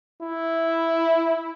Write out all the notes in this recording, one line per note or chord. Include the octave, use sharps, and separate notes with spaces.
E4